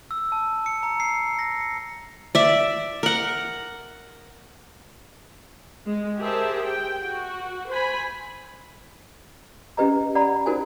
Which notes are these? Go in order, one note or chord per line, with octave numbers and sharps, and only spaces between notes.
E6
A5
C#7
A#5
C7
A#6
C#7
D5 E5
A#4 F#5
G#3
G4 G#4 A#4 C5 E5 A5
G5
F#4
C5 G#5 B5
C#4 G4 B4 D#5 A#5
D5 F#5 A#5 B5
D#4 F#4 A#4 C5 G#5